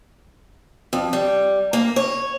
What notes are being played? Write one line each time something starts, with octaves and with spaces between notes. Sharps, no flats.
F2
G3
A#3
C#5